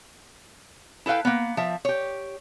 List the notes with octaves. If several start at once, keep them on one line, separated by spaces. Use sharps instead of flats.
E4 A4 B4 F5 G5
A#3 B3
F3 E5
G4 C#5